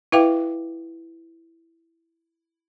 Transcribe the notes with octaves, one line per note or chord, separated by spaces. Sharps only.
E4 B4 E5 F5 G5 D6